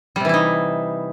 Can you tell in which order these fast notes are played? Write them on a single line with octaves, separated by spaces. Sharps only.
G3 C3 E3 E4 D#4